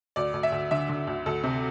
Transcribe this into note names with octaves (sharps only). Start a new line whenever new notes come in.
D2 D5
D2
E5
D2
D3 E5
D3
D2
D2 A4
C3